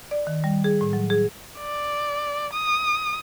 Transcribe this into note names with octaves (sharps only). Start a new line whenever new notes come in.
D5
D#3
G3
G#4
A2
F#3
G#4
D5
D#6